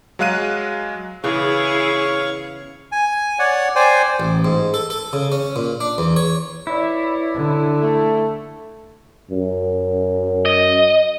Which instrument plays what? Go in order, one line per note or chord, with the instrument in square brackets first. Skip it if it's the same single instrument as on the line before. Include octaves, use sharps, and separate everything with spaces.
[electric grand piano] F#3 G#3 F5 F#6 D#7
[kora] C#3 E3 B3 [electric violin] E4 G#4 [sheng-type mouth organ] C#5 F5 C#6
[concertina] G#5
C#5 D5 F#5
C5 D5 G5 G#5
[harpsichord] A1
G#2
A4
A4
C#3
C#4
A#2
D4
E2
C#5
[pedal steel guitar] E4 [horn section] B4 C#5 D5
[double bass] D3
[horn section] A3
[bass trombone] F#2
[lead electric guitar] D#5